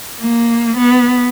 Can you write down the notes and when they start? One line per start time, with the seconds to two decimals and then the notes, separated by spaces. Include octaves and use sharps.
0.21 A#3
0.78 B3